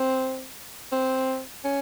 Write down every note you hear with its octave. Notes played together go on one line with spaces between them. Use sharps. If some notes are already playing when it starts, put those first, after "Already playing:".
Already playing: C4
C4
C#4